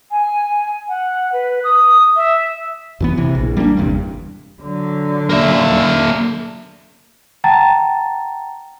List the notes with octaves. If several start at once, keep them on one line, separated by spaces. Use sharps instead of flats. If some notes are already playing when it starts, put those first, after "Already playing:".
G#5
F#5
B4
D#6
E5
F#2 E3 B3
C3 E3
A#1
G3 A#3 C#4 D4
G1 E2 G2 C3
D3 F#3
A#3 E5
F#5 G5 A5 A#5 A6